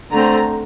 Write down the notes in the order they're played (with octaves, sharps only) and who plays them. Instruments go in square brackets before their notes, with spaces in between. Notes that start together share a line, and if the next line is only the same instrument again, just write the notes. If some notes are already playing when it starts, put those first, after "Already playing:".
[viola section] D3 A3 C4 A#5